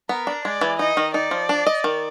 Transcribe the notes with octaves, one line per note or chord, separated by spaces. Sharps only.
B3 A#4
D4
G#3 D5
E3
D#4 D#5
D#3
D#4 D5
F3
D4
D#5
D#3